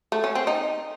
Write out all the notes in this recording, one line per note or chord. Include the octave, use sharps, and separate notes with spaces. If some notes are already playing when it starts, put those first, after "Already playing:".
A3
C#4
C4
D#4